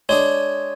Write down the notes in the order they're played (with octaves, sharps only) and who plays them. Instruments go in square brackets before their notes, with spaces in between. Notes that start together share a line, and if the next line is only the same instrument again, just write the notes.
[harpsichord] G#3 D4 G#4 [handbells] C#5